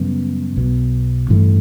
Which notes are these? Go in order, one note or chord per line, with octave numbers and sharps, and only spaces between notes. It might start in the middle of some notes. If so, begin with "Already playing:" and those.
Already playing: F#2 C#3 G3 B3
B1 B2 F#3 B3
A1 G2 E3 A3